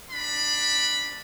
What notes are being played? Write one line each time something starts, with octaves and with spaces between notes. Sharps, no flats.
D4 B5